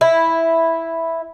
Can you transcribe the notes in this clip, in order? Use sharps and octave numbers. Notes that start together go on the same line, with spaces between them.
E4